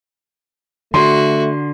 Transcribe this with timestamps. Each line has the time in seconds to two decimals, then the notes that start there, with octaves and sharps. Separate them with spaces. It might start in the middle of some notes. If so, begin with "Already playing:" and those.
0.94 D3 A3 F#4 C6